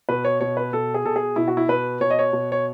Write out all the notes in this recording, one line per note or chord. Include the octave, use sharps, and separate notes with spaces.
B2 B4
C#5
B2 C#5
B4
B2 A4
G#4
B2 A4
G#4
B2 E4
F#4
E4
B2 B4
B2 C#5
D#5
C#5
B2
C#5